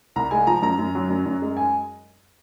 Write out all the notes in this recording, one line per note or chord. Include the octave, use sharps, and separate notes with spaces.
C2 A#5
G#3 G#5
F3 A#5
F#2 A#5
F#2
F#3
F#2
F#2
G#3
G#5